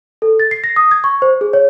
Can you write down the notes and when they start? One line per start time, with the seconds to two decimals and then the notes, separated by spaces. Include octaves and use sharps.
0.22 A4
0.40 A6
0.51 C7
0.64 A#6
0.76 D#6
0.91 G#6
1.04 C#6
1.22 C5
1.41 G#4
1.53 C#5